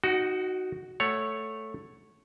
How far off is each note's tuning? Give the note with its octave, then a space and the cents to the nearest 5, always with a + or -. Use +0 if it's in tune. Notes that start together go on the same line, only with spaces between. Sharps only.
D#4 +0 F#4 +0 F#5 +40
A3 +0 C#5 +0 F#5 +0